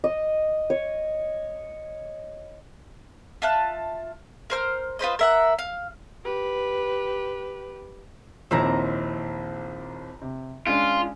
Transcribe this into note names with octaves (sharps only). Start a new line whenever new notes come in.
D#5
C#5
F4 E5 A5 F#6
A#4 C5 F6
F4 B4 C5 D#5
A#4 E5 F#5
F5
G4 B4
A#1 D#2 C4 E4 A#5
C3
G#3 C#4 D4 F4